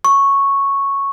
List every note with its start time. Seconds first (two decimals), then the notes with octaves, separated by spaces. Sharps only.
0.04 C#6